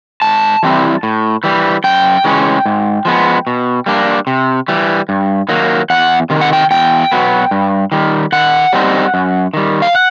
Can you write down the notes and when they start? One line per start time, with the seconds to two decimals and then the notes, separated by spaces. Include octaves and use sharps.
0.22 G#2 A5
0.63 E3 G3 C4 E4
1.03 A2
1.44 E3 G3
1.84 F#2 G5
2.24 C#3 E3 G#3 C#4
2.66 G#2
3.05 F3 G#3 B3
3.47 B2
3.86 G3 A#3 D4
4.27 C3
4.68 E3 G3
5.09 G2
5.49 D#3 F#3 A#3
5.90 E2 F#5
6.30 C3 D#3
6.41 F#5
6.53 G5
6.71 E2 G5
7.12 B2 F#3 B3
7.51 G2
7.92 D#3 G3
8.32 D#3 F#5
8.73 G3 C4 D#4
9.14 F#2
9.54 D#3 G3
9.82 F5
9.95 F#5